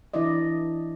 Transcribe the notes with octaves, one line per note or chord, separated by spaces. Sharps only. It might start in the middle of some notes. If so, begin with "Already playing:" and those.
E3 D4 E4 D5 D#5